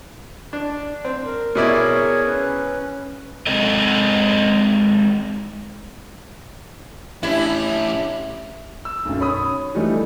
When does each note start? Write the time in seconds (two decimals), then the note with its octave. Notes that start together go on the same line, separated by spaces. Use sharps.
0.53 D4
1.05 C4
1.26 A#4
1.55 B2 E4 G#4 A#4 C#5 D5
2.27 C#4 B4
3.47 G#3 C4 D#4 A4 D#5
7.23 A2 C#4 D4 E4 G4 E5
8.85 E6
9.05 B1 F#2
9.20 C#5 B5 D#6
9.75 D#3 E3 G3 A3 D4 D#4